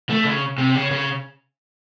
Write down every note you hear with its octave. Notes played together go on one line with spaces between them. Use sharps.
A3
C#3
C3
C#3
C#3